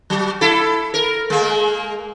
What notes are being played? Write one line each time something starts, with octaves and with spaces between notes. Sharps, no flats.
F#3
E4 A4
A#4
G#3 A#3